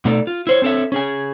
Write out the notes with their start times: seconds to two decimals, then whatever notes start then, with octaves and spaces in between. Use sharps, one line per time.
0.05 B2 A3 D#4 A4 D5
0.27 F4
0.47 E4 C5 C#5
0.62 C4 D4 A4 C#5 E5
0.92 C#4 G#4 G#5